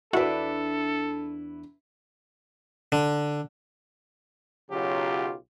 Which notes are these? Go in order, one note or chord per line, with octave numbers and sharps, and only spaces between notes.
E2 D4 E4 F#4 A4 B4
D3
B1 C#3 F#3 F4 G4